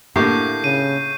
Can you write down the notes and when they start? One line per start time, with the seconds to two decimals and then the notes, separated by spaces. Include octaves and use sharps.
0.16 A2 D3 A#3 E4 G4 C#6 G6 C7
0.64 C#3 D#7